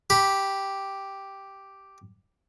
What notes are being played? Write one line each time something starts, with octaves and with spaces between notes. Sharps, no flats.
G4 B5